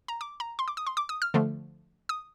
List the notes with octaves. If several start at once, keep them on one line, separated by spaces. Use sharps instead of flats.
A#5
D6
A#5
C6
D6
D#6
C6
D6
D#6
F6
D3 F3 A3
D#6